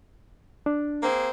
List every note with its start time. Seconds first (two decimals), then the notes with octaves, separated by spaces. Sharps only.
0.66 D4
1.02 A#3 C4 G#4